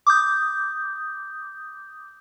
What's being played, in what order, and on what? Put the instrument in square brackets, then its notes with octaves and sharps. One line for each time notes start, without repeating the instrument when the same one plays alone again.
[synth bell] D6 D#6 G6